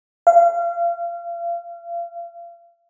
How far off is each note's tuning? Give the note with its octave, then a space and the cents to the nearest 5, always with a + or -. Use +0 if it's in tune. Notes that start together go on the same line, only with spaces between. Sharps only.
F5 -30